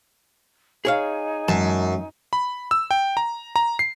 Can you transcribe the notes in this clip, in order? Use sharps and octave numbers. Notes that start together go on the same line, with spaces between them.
D#4 G#4 C#5 F5 G#5
F#2 E3 F#3 G#3 A5
B5
E6
G5
A#5
A#5
C7